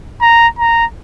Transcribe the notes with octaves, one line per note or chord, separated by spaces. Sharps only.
A#5
A#5